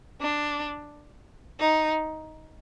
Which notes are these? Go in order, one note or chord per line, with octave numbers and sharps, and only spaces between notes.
D4
D#4